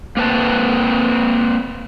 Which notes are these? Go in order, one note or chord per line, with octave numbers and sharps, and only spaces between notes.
A#3 C4 B4 A5